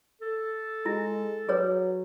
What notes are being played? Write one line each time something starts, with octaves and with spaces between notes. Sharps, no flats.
A4
G#3 E4
F#3 G#4 B4 C#5